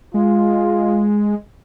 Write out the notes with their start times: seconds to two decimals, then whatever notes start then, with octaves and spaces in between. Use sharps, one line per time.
0.14 G#3 F4